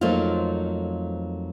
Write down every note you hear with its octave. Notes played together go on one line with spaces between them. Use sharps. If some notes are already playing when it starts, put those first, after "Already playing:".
F2 F#3 A3 A#3 D#4 F4